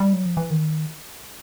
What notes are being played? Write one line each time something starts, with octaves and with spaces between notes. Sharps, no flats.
G3
F#3
F3
E3
D#3